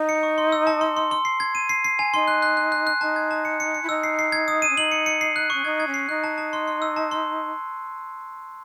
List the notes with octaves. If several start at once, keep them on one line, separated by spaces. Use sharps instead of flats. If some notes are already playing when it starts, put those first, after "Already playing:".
Already playing: D#4
C#7
C#6
C6
E6
A5
C6
C6
C6
C7
G#6
D#7
C7
C7
G#5
D#4 C6
F#6
F#6
F#6
F#6
F#6
D#4 A5
G#6
A5
C#7
C#7
C#7
E4
D#4 E6
C7
C7
G#6
D#6
D#7
C#4
D#4 F#7
C#7
C#7
C7
F#6
C#4 C#6
D#4 G#6
G#6
C#4
C7
D#4 F#6
A5
A5
C6
C6
E6
A5
C6